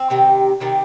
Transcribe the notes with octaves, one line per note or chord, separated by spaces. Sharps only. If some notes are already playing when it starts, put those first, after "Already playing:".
Already playing: C4
C3 D#3 G3
C3 D#3 G3